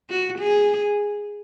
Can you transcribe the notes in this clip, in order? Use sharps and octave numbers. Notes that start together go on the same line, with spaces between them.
F#4
G#4